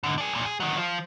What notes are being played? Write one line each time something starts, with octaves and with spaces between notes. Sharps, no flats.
G#2 D3
D4 G#4
B1 A#2
G#4
D#3 F#3
F3